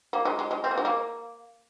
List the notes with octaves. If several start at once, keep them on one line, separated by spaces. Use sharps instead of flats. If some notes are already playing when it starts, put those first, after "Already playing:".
A#3
G#3
G#3
G#3
C4
A#3
G#3
A#3